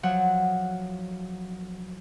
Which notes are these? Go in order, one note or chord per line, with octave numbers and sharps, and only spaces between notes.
F3 F#3 F#5